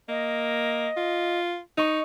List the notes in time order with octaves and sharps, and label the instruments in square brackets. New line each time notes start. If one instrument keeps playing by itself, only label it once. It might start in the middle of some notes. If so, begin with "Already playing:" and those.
[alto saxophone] A#3 [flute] D#5
[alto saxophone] F4
[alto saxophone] D#4 [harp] D#5 C#6